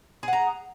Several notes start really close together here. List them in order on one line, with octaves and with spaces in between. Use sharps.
G#4 F#5 A#5